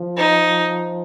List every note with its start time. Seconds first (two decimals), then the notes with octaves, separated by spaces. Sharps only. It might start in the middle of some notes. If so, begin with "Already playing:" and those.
Already playing: F3
0.17 D#4